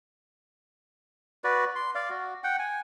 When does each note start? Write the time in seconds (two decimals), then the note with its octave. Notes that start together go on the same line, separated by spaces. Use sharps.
1.44 F#4 B4 D5
1.76 C6
1.95 D5 F5
2.10 F#4
2.44 F#5 G5
2.59 G#5